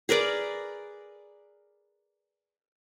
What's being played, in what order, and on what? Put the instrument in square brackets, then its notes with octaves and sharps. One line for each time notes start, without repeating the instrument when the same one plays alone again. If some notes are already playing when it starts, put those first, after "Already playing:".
[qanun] G#4 A#4 B4 D5